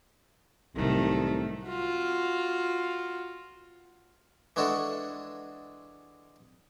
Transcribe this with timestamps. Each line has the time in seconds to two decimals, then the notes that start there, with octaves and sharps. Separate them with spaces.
0.76 C2 A2 C3 D#3 F#3 A3
1.66 F4 F#4
4.56 E3 G#3 D4 F#4 A4